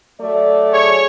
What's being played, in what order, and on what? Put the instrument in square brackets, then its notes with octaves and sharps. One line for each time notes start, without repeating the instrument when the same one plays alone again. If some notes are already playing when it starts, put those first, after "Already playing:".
[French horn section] F#3 A3 D5
[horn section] G#4 C#5